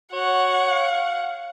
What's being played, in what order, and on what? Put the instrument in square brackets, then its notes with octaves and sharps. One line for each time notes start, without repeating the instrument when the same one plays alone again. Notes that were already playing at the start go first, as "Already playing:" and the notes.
[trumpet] F#4 [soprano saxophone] C#5 [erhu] F#5
[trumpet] F5